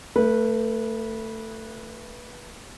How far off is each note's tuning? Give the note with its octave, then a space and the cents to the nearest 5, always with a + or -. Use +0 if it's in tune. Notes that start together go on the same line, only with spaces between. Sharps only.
A3 +20 B4 -15